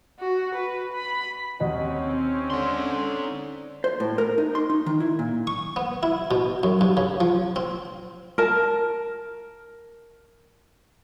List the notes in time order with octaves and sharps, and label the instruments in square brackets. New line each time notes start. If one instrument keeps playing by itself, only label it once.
[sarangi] F#4
B4
B5
[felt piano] D#2 D#5 F#5 [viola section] C4 C#4
[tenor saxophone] D3 [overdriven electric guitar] D#4 C6
[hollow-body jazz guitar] C5
A2
A#4
D#4
C6
D#4
D#3
E4
A#2
[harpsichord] C#6
B3
E4
B2
F#2
G2
C#3
F3
C4
[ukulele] A#4 A5